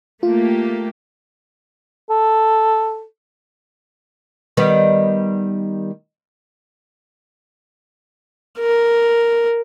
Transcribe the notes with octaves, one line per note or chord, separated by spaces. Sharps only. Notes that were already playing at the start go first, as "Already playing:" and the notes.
A3 A#3 F4 G4
A4
D#3 G3 B3
A#4